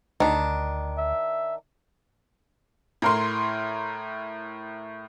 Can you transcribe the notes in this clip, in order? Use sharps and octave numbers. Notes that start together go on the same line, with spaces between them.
D2 D#3 D4
E5
A2 A#4 C6